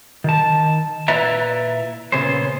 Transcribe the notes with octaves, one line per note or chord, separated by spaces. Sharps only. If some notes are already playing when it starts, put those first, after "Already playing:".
D#3 A5
A#2 E4 B4 D5 E5 A#5
A#2 C#3 B3 G#4 C5